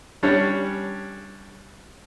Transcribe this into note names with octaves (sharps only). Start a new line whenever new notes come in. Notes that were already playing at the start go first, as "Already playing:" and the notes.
G3 C#4 D4 G4 C#5